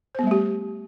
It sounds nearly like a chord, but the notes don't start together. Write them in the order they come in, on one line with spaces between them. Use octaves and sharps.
C5 B3 G3 A3 G4